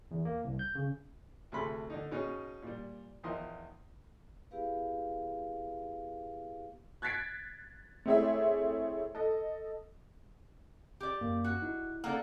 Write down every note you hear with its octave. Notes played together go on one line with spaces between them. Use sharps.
E2
A#3
C2
G6
C#3
D2 C3 G#4 A4 B5 C6
D3 D#4
B2 C#4 D#4 G#4
A#2 G3
E2 D#3 F3 D#5 C6
B3 E4 G4 G#4 B4 F5
F#6 G#6 A6 B6 C7 D7
A3 C4 E4 G#4 C#5 E5
A4 D#5
G4 D5
F#2 A#3
F#4
D#4 E4
A#3 A4 D5 F#5